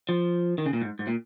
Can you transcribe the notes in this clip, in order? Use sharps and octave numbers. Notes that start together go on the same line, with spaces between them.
F3
D#3
C#3
A#2
G#2
G#2
A#2